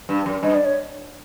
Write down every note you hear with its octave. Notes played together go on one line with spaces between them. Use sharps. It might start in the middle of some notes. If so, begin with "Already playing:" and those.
G2
F#2
G2 D#5
D5
C#5